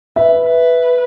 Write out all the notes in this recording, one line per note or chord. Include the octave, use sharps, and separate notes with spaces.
B4 E5
B4